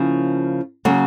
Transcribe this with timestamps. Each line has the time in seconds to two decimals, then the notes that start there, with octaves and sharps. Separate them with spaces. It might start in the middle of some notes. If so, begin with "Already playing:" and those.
Already playing: C#3 F3 A#3 C#4 E4
0.85 C#3 F#3 A#3